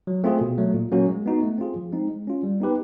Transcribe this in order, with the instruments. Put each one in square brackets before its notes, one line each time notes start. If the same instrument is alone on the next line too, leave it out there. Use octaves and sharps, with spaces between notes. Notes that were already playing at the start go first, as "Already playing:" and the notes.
[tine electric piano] F#3
A3 C4 F4 G#4
B2
F#3 A3
A#2
F#3 A#3 C#4 F#4
G#3
B3 D#4 F#4
A3
C4 F4 G#4
F3
G#3 C4 D#4
G#3
C#4 F4
G3
B3 D#4 G4 B4